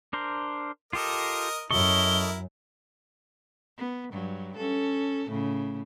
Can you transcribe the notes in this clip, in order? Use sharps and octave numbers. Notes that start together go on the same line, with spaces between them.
D4 A#4 C5
F4 G4 A4 A#4 D#5
F#2 E4 A4 A#4 D#5 C#6 G7
B3
G2 F#3
C#4 A4
A2 C#3